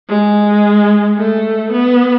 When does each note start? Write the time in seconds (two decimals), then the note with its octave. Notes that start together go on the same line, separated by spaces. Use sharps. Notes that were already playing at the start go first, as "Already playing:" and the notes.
0.08 G#3
1.17 A3
1.72 B3